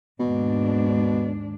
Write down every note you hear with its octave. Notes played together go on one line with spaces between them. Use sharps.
D#2 G#2 B2 D4